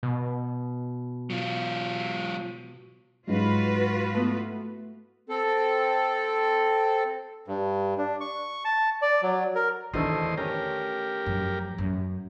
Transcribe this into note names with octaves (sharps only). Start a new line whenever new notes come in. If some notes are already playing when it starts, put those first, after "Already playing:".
B2
F#3 F4
G#2 F#3 G#3 F4 F#4 B4
A3 B3 E4
C4 A4
G2
D4
C#6
A5
D5
F#3
A#4
E2 B2 D3 D#3 A3 C5 D#5
C#4 G4 A#4
F#2 F3
F#2